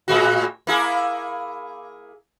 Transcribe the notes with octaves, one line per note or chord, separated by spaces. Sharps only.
A2 G#3 F#4
A#3 E4 G#4